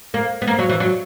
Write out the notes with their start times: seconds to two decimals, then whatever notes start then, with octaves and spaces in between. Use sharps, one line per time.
0.14 A#3
0.42 B3
0.47 A#3
0.59 F#3
0.69 E3
0.80 F#3